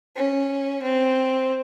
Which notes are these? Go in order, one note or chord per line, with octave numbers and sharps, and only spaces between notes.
C#4
C4